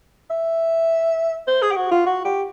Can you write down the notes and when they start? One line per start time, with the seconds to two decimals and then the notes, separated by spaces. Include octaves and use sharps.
0.31 E5
1.48 C5
1.62 G#4
1.71 G4
1.77 F#4
1.92 F4
2.06 F#4
2.25 G4